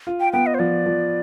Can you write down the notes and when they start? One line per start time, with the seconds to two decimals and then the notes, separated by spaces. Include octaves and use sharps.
0.07 F4
0.20 G5
0.33 B3 G5
0.46 D#5
0.54 C5
0.59 F3 D5
0.86 F3